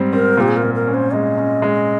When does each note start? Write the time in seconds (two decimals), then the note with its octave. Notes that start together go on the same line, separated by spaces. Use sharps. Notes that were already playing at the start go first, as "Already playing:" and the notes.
Already playing: G#2 G3 C4
0.13 C4 A#4
0.37 A#2 G4
0.48 G#4
0.57 A#4
0.62 A#2
0.75 A#4
0.87 C#4
0.94 C5
1.13 G#3 D#5
1.37 C#4
1.62 G#3